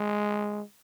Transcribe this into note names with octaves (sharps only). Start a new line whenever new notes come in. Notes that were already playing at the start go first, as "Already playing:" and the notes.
Already playing: G#3